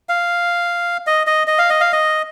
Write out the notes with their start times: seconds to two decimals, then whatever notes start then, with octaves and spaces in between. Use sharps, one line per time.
0.09 F5
1.07 D#5
1.27 D#5
1.47 D#5
1.58 F5
1.70 D#5
1.81 F5
1.93 D#5